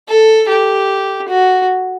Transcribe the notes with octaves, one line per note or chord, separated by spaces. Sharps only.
A4
G4
F#4